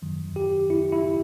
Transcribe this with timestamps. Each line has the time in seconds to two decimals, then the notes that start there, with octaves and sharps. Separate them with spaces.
0.02 F#2 D#3 F#3
0.36 G4
0.70 E4
0.92 E4